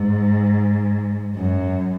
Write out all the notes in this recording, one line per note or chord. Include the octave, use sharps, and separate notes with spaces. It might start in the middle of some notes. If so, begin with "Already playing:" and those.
Already playing: G#2
F#2